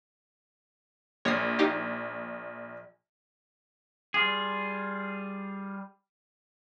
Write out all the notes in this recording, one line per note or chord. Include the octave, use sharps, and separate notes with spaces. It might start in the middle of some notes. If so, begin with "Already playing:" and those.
A#1 C#5 D#6 C7
D#4 G4 F5
G3 F4 G#4